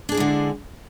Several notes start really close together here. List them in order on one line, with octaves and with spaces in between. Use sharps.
D4 G#4 E4 G#3 D3